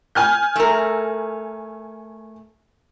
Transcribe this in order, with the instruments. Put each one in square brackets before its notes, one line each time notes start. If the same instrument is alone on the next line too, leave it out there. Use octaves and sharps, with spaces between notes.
[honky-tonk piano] G#5 F6 G6
[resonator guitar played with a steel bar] A3 A#4